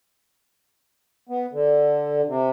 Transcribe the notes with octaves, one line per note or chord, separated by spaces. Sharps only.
B3
D3
C3